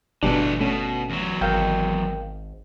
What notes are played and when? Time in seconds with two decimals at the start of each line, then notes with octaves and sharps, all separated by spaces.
0.23 G1 B2 E3 G3 A3 D4
0.61 B2 A3 C#4
1.10 E2 F#3
1.41 G#1 A#4 F5 G5